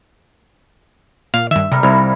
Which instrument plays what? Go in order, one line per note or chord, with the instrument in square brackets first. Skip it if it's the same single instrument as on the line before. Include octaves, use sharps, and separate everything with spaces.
[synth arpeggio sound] A#2 [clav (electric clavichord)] F5
[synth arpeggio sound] G2 D#3 [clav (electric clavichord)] E5
[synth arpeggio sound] C3 [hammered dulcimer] G3 A#4
[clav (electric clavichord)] C2 [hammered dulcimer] E4 F5 [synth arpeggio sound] F6